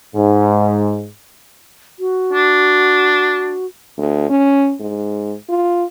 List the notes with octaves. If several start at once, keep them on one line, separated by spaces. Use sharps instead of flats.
G#2
F#4
D4
D2
C#4
G#2
F4